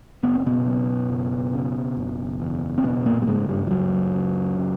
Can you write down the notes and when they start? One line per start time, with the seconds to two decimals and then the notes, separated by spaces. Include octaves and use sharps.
0.23 F#1 B3
0.35 C4
0.46 B2 B3
0.67 F#2
1.10 F#1
1.54 C#3
1.97 F#1
2.40 E2
2.78 C4
2.84 F#1 B2 B3
3.06 A#2 A#3
3.22 G3
3.27 G#2 C#3 G#3
3.49 G2 G3
3.67 F3
3.71 C#2 F#2 F#3
4.15 C#3
4.59 C#3